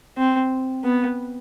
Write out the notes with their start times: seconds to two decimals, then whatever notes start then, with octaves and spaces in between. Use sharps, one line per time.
0.17 C4
0.84 B3